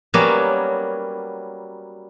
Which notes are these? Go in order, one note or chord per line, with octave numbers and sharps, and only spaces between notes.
F#3 G3 A#3 B3 C#4